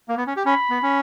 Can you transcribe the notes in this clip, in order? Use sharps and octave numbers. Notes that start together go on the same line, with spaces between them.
A#3
B3
C#4
G4
C#4 B5
B3
C#4